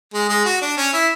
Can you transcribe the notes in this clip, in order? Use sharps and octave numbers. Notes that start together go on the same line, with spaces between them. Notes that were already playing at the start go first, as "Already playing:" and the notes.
G#3
G#3
F#4
D4
C#4
E4